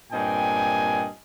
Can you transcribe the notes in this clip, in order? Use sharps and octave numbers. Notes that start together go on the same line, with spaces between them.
G2 A#2 C4 D#5 G5 G#5